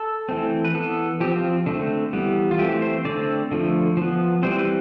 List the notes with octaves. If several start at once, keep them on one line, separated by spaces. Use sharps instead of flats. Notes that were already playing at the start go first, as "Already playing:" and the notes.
Already playing: A4
E3 A3 C4
B4
E3 B3 A4
F3 C4 G4
F4
D3 A3 C4
E3 G3 B3
F4
E3 A3 C4 G4
C5
D3 A3 C4 D5
D3 F3 A3
F3 B3
E3 G3 C4 C5
B4